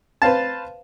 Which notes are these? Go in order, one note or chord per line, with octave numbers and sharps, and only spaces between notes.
B4 C5 F5 A5